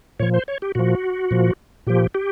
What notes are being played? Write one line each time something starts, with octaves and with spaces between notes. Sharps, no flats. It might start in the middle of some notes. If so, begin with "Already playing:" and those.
A#2 F3 C#5
C5
C#5
G4
A#2 F3 F#4
A#2 F3
A#2 F3 G4
G4